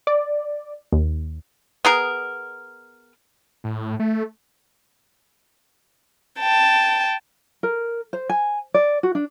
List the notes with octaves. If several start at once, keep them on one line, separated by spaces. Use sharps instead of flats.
D5
D#2
B3 G#4 A#4
A2
A3
G5 A5
A#4
C5
G#5
D5
F#4
D4